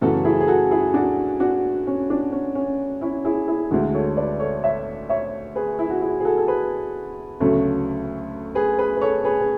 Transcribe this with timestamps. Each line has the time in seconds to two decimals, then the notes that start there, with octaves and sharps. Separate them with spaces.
0.01 F#2 C#3 E3 A3 F#4 A4
0.25 E4 G#4
0.41 G#4
0.48 F#4 A4
0.71 E4 G#4
0.94 D4 F#4
1.40 D4 F#4
1.87 C#4
2.10 D4
2.32 C#4
2.55 C#4
3.01 C#4 E4
3.24 E4 G#4
3.48 E4 G#4
3.71 D2 D3 G#3 F#4 A4
3.94 A4 C#5
4.17 B4 D5
4.40 A4 C#5
4.64 C#5 E5
5.09 C#5 E5
5.56 G#4 B4
5.79 E4
5.90 F#4
6.01 E4 G#4
6.20 G#4
6.24 F#4 A4
6.38 A4
6.48 G#4 B4
7.40 D2 C#3 F#3 A3
8.55 G#4 B4
8.79 G#4 B4
8.97 B4
9.01 A4 C#5
9.25 G#4 B4
9.41 G#4